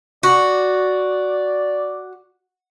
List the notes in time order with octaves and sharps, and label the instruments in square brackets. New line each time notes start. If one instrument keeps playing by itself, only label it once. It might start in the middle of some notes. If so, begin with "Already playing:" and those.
[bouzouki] F#4 [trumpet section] D5